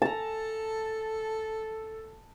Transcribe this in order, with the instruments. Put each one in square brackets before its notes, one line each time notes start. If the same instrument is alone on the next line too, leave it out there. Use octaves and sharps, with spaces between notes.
[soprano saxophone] A4 [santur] A5 A#5